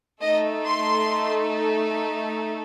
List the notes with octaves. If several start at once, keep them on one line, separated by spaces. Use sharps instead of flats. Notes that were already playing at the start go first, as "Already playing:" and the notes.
A3 D#4 A4 D#5
C6